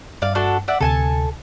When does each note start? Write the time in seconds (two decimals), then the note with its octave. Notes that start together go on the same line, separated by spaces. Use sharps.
0.22 G2 D5 F5
0.35 D4 F#4 A4
0.68 D5 E5 F#5
0.80 D2 C3 A4 G#5 A5